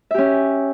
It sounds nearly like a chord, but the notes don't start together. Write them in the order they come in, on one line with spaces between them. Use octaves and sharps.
E5 G4 C#4